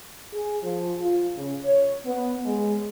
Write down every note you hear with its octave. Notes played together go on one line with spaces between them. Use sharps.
G#4
F3
F4
C#3
C#5
B3
G#3